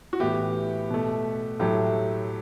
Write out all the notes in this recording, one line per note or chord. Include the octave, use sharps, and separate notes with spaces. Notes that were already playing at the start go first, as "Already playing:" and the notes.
F#4
A2 E3 B3 G4
B2 A3
A2 F#3 A3 G4